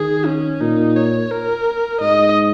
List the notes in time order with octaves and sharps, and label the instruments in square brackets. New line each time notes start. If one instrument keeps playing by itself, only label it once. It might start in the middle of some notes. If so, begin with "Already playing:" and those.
Already playing: [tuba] D#3 [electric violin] G#4
[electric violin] C#4
[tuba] A#2 [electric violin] D#4
[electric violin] C#5
A#4
[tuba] G#2 [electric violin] D#5